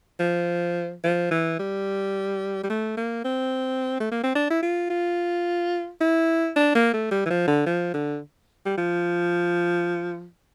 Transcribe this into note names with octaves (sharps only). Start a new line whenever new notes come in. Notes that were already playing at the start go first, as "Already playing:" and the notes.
F3
F3
E3
G3
G3
A3
A#3
C4
A3
A#3
C4
D4
E4
F4
F4
E4
D4
A#3
A3
G3
E3
F3
D3
F3
D3
G3
F3